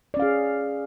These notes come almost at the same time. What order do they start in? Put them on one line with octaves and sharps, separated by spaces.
D5 C#4 F5 G#4